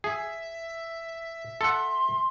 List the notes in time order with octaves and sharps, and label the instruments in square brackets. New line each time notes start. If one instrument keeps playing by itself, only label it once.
[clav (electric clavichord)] G#4 [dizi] E5
[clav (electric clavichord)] A4 F#5 [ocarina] C6